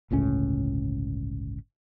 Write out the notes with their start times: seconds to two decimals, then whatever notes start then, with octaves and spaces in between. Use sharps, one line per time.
0.11 G1 C#2 A2 C#4